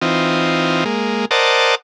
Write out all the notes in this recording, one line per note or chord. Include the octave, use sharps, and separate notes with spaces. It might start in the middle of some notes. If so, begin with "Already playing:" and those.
E3 C4 D#4 F4
G#3 A#3
A#4 C5 D5 D#5 F#5 A5